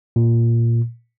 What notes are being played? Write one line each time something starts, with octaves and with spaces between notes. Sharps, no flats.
A#2